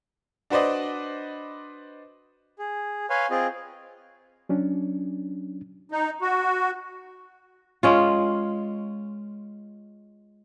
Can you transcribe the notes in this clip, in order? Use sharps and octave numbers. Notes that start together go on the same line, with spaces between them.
D4 F#4 B4 C5 D5 D#5
G#4
B4 C#5 F5 G#5 C6
C4 F4 G#4 D#5
F#3 C#4 D4
D#4
F#4
G#3 C#4 F4